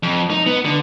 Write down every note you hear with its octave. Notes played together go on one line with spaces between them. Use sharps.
F2
D#4
B3
D3